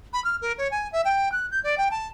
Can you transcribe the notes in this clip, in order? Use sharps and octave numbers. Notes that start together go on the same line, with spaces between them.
B5
F6
A#4
C#5
G#5
E5
G5
F#6
G6
D5
G5
A5